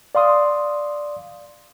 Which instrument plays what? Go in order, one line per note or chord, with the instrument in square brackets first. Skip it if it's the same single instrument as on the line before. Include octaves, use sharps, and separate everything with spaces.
[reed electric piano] D5 F5 C6 D#6